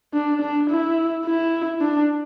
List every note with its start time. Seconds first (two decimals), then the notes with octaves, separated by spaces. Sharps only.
0.14 D4
0.41 D4
0.69 E4
1.25 E4
1.81 D4